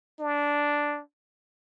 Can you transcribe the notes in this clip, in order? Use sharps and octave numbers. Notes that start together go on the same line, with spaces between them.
D4